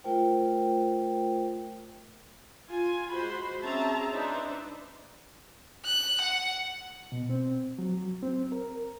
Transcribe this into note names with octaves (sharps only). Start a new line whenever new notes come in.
A3 F4 A#4 C5 G5
F4 G#5
G#3 F#4 C5 B5 C6
C4 C#4 G#4 E5 A5 A#5
D4 D#4 B4 C5 D5 E5
F#6
F#5
B2
C4
F#3
C4
A#4